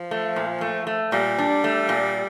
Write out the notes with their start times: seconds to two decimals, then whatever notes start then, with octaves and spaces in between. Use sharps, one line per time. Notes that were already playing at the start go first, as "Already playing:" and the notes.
Already playing: F3
0.11 A3
0.36 A#2
0.61 A3
0.87 A3
1.12 A#2 G3
1.38 D4
1.64 A3
1.89 A#2